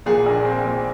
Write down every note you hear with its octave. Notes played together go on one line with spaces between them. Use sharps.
A#2 G#4
A#1
C4
A#2